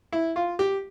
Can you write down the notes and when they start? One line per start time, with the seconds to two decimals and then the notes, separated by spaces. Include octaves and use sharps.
0.12 E4
0.36 F4
0.59 G4